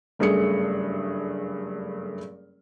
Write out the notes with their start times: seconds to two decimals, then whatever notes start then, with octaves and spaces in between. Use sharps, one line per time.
0.19 F#1 G2 A3 G#4 C#7